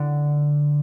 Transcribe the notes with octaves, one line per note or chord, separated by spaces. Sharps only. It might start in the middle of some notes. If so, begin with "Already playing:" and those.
Already playing: D3